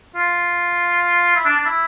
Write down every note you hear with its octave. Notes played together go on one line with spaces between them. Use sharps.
F4
E4
D4
D4
E4